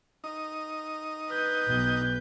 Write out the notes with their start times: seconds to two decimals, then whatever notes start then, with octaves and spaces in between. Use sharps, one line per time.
0.24 D#4
1.29 B4 G6
1.68 B1